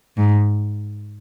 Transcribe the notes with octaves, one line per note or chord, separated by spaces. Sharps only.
G#2